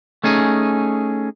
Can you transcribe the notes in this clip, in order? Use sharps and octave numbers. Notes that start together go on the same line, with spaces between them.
A3 C#4 D#4 G#4